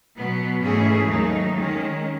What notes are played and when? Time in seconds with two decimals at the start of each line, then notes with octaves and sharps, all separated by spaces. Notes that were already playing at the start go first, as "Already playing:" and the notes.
0.15 B2 F#3 B3
0.62 G#2 E3 A3 C#4 G#4
1.09 D#2 D#3 F#3 A3 D#4
1.55 D#3 G#3 C#4